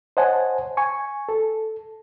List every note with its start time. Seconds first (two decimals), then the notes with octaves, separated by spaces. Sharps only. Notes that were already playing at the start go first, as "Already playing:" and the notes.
0.17 C5 C#5 D#5 F#5 G#5 A5
0.77 G#5 C#6
1.29 A4